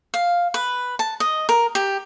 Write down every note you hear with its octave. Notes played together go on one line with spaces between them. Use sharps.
F5
B4
A5
D#5
A#4
G4